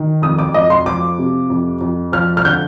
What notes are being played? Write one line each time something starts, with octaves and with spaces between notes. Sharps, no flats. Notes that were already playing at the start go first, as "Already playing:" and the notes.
Already playing: D#3
F2 D#6
D6
F2 D#5
C6
F3 D6
C3
F2
F2
F3 F6
F6
D3 G6